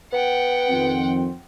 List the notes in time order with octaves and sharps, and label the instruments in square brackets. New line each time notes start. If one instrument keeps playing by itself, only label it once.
[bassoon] B3 [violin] F#5 G5
[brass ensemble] F2 D#3 C4